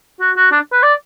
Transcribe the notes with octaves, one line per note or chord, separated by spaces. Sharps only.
F#4
F#4
D4
B4
D5